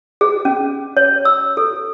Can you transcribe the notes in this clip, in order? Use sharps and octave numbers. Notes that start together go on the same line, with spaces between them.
G#4
C#4
C#5
E6
A4